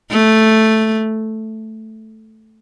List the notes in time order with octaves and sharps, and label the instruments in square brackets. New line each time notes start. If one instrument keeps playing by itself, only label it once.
[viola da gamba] A3